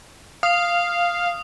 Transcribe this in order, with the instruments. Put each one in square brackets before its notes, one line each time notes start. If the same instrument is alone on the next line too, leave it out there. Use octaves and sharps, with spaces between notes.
[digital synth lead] F5 [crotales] D#6